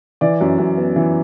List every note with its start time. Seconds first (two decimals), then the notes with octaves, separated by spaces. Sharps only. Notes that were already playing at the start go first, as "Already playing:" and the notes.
0.21 E3 D5
0.41 F#2
0.59 F#2
0.78 B3
0.96 E3